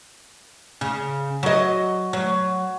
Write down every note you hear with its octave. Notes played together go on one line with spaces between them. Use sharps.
C#3
F#3 D#5
F#3